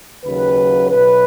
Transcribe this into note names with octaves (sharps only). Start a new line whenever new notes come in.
D#2 C#3 F#3 B4
B1 B2 F#3 B4